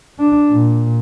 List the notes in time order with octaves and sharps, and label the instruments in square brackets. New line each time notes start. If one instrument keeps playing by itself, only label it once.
[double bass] D4
A#2